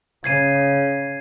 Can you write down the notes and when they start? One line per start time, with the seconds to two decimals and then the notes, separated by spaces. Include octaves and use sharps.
0.24 C#3 G#6 C7 D#7